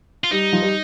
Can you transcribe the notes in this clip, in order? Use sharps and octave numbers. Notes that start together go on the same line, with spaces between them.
F4
G3 D#4
F3
G3